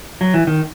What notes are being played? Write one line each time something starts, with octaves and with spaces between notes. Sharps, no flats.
F#3
E3
D#3